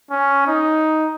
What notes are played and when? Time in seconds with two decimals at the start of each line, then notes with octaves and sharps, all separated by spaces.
0.11 C#4
0.47 D#4